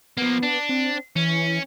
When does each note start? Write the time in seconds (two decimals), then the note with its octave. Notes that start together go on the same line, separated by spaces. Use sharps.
0.17 F3 A#3 B3
0.43 D4
0.69 C4
1.16 E3 C#4